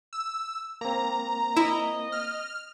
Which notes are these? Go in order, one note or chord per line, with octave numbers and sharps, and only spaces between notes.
E6
A#3 C4 A#5
E4 D#5
F6